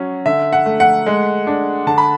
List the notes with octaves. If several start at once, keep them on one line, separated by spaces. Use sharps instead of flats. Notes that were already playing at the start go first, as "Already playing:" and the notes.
Already playing: F#3 C#4
D3 E5
F#5
A3
F#5
G#3
D4
D3 A5
B5